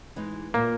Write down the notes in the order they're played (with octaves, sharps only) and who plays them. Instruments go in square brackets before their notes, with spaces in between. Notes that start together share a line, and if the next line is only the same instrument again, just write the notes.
[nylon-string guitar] E3 G#3 D#4
[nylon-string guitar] A#2 [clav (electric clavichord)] A#3